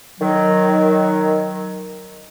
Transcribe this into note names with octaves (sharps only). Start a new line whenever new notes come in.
D#3 F#3